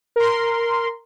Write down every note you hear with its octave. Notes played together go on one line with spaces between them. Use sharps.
A#4 C6